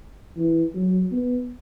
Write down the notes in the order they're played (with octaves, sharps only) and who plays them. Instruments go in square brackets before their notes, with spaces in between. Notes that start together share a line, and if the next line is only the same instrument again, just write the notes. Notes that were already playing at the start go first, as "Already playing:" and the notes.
[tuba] E3
F#3
B3